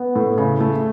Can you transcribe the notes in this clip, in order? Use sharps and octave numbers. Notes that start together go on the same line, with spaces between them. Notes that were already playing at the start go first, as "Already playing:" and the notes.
Already playing: B3
A2
C#3
A3